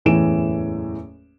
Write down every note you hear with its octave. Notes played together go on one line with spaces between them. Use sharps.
F#1 E2 A2 E3 D7 E7